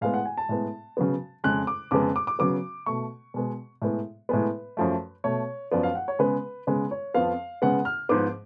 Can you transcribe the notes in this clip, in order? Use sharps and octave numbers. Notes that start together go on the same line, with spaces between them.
A2 G#3 B3 F5
F#5
G#5
A5
A2 G#3 B3
C#3 F#3 B3
F2 C#3 G#3 F#6
D6
F2 C#3 G#3 B3 D6
D6
D6
C#3 F#3 B3 D6
B2 A3 C#6
B2 G#3 B3
A2 G#3 B3
A2 G#3 B3 B4
F#2 F3 A3
B2 A3 C#5
F#2 F3 B3 D5
F5
F#5
C#5
C#3 G#3 B3 B4
C#3 G#3 B3 B4
C#5
F2 F3 B3 F5
C#3 G#3 B3 F#5
F6
G#2 F3 B3 D6